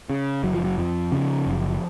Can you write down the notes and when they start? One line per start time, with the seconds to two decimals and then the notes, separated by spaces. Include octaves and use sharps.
0.10 C#3
0.43 F#1 F#3
0.54 F3
0.64 F#3
0.78 F2 F3
1.12 C#3
1.47 F#1